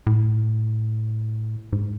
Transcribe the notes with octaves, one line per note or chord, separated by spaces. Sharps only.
A2
G#2